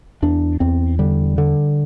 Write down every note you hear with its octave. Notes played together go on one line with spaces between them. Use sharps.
E2 D4
E2 C4
D3 G3
D3